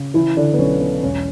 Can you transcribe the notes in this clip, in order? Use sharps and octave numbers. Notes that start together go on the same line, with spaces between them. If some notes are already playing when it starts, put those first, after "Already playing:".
Already playing: C#3
E3 E4
D3 D4
B3
B1 C#4
B3
E1 C#4